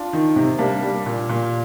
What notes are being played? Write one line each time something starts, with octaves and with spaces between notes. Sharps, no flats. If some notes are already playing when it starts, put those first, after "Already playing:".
Already playing: D4 F4
D#3
C3
G3 A#3 D4
G3
A#2
A#2